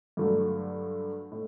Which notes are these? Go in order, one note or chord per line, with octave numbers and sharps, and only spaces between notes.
G2 D3 F#3 A3
A2